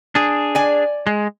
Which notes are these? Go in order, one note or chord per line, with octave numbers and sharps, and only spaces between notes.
D4 G#4
D5 G#5
G#3